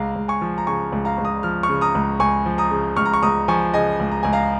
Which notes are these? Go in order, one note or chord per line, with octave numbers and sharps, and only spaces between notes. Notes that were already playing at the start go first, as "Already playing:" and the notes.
Already playing: C#2 F5 A#5
C#2
G#5 C#6
F3
A#5
C#3 G#5 C#6
C#2
F5 A#5
C#2
A#5 D#6
F3 F6
C#6 F6
C#3
A#5 D#6
C#2
C#2 G#5 C#6
F3
A#5 D#6
C#3
C#2 C#6 F6
A#5
C#6
C#2 A#5 D#6
F3 G#5 C#6
C#3 D#5 G#5
C#2
A#5
C#2 G#5
F5 A#5